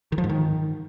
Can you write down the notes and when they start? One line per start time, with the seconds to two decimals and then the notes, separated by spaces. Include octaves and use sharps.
0.12 D#3
0.18 F3
0.24 G#2
0.29 D#3